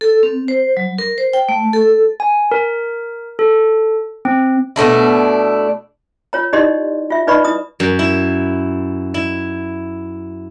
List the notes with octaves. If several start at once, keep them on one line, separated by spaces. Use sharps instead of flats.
A4
C4
C5
F#3
A#4
C5
G5
A3
A4
G#5
A#4
A4
C4
B2 A3 D4 E4
F4 C#5 A#5
D#4 E4 G4 D5 D#5 C6
F4 E5
D#4 B4 D5 D#5 B5 C#6
E4 A#5 D#6
F#2
E4
E4